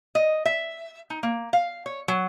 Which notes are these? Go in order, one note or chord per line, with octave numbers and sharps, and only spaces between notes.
D#5
E5
D#4
A#3
F5
C#5
F#3